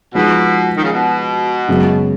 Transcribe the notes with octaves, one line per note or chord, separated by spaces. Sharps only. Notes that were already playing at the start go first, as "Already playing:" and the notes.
B2 F3 G#3 D#4 G#4
D#3
C#3
B2
F#2 C#3 G#3 B3 F#4